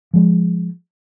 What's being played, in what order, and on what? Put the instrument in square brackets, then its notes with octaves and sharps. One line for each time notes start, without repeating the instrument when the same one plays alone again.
[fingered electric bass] F3 G#3